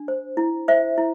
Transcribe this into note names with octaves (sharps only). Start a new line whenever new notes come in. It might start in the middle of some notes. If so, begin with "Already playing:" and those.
Already playing: D4
C5
E4
C5 E5
E4